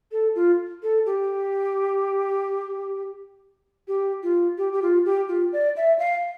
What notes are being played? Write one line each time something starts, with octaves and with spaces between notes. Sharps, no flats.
A4
F4
A4
G4
G4
F4
G4
G4
F4
G4
F4
D5
E5
F5